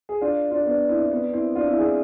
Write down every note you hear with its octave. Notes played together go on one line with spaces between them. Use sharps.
G#4
D4 F4
D4 F4
B3 D4
C4 E4
E4
B3 D4
C4 E4
D4 F4
C4 E4
E4 G#4